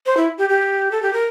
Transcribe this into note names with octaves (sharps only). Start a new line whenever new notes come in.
C5
E4
G4
G4
A4
G4
A#4